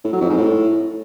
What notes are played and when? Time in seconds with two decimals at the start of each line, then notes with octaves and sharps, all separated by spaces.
0.04 A2
0.13 F#3
0.21 F2
0.29 G#2
0.37 A2